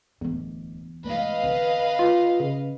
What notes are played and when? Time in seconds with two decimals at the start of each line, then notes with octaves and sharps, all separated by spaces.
0.21 D1 E2 D3
1.04 G#2 A3 B4 D#5 F5
1.43 D3 C4
1.99 F4
2.40 C#3